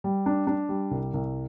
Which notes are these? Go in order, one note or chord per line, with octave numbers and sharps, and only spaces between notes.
G3
D4
D4
G3
C2
C2